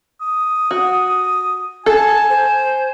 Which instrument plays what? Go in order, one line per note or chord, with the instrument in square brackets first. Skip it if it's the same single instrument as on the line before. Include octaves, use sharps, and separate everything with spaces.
[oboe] D#6
[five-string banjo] F#4
[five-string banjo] A4 [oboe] G#5 [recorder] A5
[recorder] C5